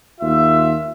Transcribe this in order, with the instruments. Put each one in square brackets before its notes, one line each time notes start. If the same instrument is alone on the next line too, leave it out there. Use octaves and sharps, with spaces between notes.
[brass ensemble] D#2 F4 E5